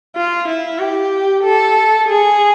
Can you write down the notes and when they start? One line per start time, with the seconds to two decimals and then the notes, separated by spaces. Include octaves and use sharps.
0.16 F4
0.48 E4
0.79 G4
1.44 A4
2.08 G#4